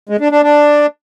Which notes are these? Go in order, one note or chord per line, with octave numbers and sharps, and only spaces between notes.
G#3
D4
D4
D4